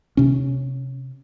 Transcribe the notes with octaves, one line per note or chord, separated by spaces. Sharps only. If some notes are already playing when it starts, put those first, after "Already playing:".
C3 C#4